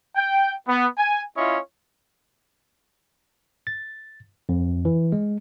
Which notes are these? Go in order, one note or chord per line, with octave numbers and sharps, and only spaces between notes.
G5
B3
G#5
C#4 E4 F4 C#5 D#5
A6
F2
E3
G#3